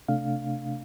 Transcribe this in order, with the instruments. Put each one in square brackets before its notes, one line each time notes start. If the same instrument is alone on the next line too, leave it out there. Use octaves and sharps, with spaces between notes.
[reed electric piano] C3 A3 D4 F5